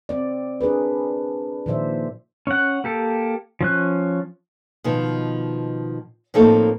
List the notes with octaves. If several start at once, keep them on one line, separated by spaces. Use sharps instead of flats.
C4 D5
D4 G#4 A#4 B4
A#2 D#3 F3 C5 D5 E5
C#4 F#5
A#3 G4 A4
F3 C#4 F#6
B2 D#3 F3
A2 F3 A#3 C4 D#4 A4